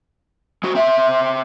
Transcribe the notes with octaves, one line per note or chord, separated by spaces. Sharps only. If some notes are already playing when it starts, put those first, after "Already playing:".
G#3 F#4
C4 E5